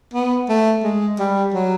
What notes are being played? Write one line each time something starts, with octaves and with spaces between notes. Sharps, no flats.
B3
A3
G#3
G3
F#3